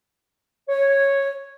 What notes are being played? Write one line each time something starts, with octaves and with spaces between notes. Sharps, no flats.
C#5